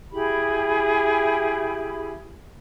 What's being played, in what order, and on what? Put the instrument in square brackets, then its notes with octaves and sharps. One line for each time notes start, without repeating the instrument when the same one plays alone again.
[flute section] E4 G4 G#4 B5